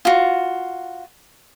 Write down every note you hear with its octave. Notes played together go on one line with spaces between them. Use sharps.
F4 F#4